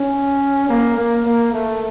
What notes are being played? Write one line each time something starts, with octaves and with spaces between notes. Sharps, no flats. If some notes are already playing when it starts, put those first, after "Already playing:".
Already playing: C#4
A#3
A#3
A#3
A3